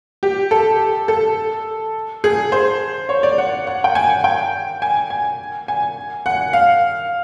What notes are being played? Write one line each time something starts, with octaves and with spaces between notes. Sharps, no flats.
G4
A4
A4
G#4
C5
C#5
D5
F#5
F#5
G5
G#5
G5
G#5
G#5
G#5
F#5
F5